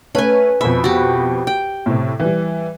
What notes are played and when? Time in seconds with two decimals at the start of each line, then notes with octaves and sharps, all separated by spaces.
0.15 A3 C#4 B4 G#5
0.61 F2 B2 E5 B5
0.84 F#4 G4
1.47 G5
1.86 A2 C3
2.20 E3 G3